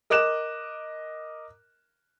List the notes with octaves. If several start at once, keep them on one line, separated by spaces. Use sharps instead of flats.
A#4 D#5 D6 F#6 E7